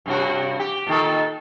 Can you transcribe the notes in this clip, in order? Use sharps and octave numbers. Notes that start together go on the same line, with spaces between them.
G2 C3 F#4
G4
A#2 D#3 A4